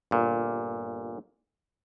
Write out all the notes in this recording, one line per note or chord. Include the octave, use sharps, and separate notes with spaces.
G1 A#2